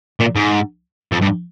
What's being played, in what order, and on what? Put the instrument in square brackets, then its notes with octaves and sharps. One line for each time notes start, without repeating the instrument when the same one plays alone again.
[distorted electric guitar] A#2
G#2
F2
G2